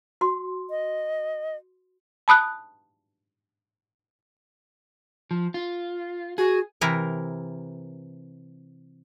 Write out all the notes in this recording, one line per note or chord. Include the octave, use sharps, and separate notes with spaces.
F#4 C6
D#5
A5 B5 D#6 F#6
F3
F4
F#4 G#4
C3 E3 E4 A#4